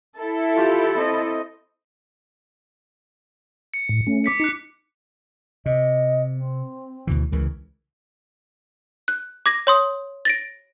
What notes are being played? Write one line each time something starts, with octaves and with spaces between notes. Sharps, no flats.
E4 A4
F4 G4
C4 D#5
C#7
A2
A3 C#4
D6 B6 C#7
D#4 F#6 B6 C#7
C3 D#5
C4
D2 B2 E3
C#2 C#3 E3 A#4
F#6
D6 G#6 A#6
C#5 C6 D#6
A6 A#6 D7